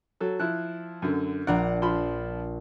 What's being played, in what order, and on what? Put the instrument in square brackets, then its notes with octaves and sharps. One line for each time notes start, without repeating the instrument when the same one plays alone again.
[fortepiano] F#3 A4
[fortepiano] F3 E4 [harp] F#6
[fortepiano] F#2 D3
[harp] A#1 D4 [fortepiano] F#5 A#5
[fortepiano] F3 B5 [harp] C6